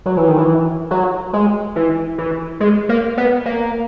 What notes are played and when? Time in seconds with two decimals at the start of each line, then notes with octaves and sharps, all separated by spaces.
0.06 F#3
0.17 E3
0.27 D#3
0.38 E3
0.91 F#3
1.33 G#3
1.76 E3
2.18 E3
2.60 G#3
2.89 A#3
3.17 B3
3.45 A#3